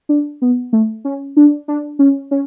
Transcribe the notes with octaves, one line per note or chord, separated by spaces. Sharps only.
D4
B3
A3
C#4
D4
D4
C#4
C#4